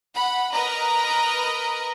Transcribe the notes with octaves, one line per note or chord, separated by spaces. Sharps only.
F#5 B5
A#4 B4 D#5 A#5